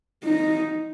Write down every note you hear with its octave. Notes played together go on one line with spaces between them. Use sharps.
D#4